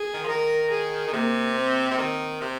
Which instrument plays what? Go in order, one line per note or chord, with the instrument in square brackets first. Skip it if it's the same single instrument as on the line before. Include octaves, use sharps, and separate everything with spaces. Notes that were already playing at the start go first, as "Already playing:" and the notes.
Already playing: [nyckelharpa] G#4
[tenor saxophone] D#3
F3
[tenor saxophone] D#3 [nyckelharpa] A#4
[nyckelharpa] G#4
[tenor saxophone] D#3
[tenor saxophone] C3 [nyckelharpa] A#3
[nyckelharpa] C4
[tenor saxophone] C3
D#3
C3